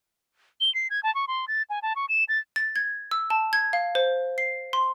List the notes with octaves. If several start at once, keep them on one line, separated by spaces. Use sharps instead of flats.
G7
C7
G#6
A5
C#6
C6
A6
G#5
A5
C#6
E7
A6
A6
G#6
E6
A5
G#6
F5
C5
C7
C6